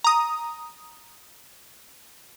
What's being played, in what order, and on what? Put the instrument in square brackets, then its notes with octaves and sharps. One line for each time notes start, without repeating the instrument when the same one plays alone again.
[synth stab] A#5 D#6